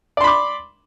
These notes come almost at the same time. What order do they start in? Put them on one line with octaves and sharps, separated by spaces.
D5 C6 B5 D6